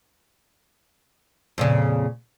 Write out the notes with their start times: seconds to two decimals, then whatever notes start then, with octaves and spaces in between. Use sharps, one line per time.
1.58 F2 A#2 C#3